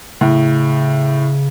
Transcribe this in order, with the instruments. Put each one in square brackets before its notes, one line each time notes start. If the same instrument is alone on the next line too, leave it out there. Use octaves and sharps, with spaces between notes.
[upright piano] A2 [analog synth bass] C#3